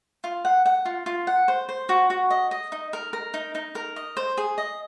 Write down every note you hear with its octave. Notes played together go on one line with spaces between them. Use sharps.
F4
F#5
F#5
F4
F4
F#5
C5
C5
F#4
F#4
D#5
D#5
D#4
A#4
A#4
D#4
D#4
A#4
D#5
C5
G#4
D#5